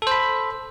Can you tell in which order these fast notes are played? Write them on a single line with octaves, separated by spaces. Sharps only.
A4 C5 B5